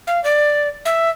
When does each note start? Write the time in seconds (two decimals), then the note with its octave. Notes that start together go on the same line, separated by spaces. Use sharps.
0.07 F5
0.24 D5
0.85 E5